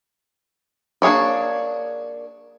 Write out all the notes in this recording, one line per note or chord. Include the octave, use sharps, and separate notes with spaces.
A#3 D4 G#4 C#5 D5